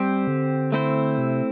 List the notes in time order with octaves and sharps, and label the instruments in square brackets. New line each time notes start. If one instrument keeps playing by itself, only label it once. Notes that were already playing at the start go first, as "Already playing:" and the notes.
Already playing: [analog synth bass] G3 [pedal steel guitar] C4 G4 C5
[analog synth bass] D3
[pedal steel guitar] A3 C4 E4 C5
[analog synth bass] C3